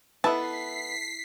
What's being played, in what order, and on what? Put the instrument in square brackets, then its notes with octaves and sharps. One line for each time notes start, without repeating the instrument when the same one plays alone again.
[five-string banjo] B3 A5 [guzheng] E4 [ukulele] A4 B4 [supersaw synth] B6 C7